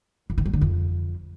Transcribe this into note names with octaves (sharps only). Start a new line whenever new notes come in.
F2
D#3
F#3
D3
F2